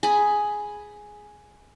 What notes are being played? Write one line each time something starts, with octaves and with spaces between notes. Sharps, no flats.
G#4 B5